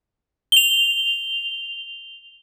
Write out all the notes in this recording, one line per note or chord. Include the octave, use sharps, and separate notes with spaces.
F7 G7